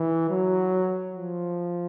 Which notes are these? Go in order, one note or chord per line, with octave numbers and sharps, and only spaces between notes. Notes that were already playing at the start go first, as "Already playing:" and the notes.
Already playing: E3
F#3
F3